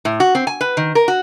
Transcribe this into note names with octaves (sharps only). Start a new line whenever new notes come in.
A2
F#4
C4
G#5
B4
D#3
A#4
F#4